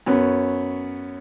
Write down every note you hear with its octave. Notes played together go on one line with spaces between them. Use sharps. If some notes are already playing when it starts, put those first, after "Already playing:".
F#2 B3 C#4